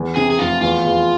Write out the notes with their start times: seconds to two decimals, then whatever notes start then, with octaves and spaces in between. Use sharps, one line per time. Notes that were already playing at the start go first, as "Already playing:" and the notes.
Already playing: E2
0.16 C3 G#4
0.30 G#4
0.39 F1 F4
0.61 E2 F4
0.85 E2